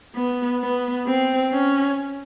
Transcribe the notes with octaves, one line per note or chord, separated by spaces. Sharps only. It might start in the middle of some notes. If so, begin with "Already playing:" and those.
B3
B3
C4
C#4